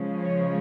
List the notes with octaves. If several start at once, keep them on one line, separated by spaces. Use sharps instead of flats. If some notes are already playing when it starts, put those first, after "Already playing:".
Already playing: C#3 F3 G#3 C#4
C#5